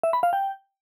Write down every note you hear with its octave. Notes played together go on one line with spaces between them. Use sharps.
E5
B5
F5
G5